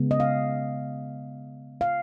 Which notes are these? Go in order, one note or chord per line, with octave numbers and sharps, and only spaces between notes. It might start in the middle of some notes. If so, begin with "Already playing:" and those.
Already playing: C#3 G#3 B3
D#5
F5
F5